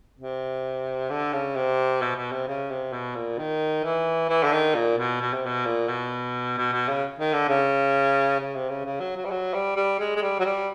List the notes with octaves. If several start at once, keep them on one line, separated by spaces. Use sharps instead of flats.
C3
D3
C#3
C3
B2
B2
C3
C#3
C3
B2
A#2
D#3
E3
E3
D3
D#3
A#2
B2
B2
C3
B2
A#2
B2
B2
B2
C#3
D#3
D3
C#3
C#3
C3
C#3
C#3
F#3
F#3
G3
F#3
G3
G3
G#3
G#3
G3
F#3
G3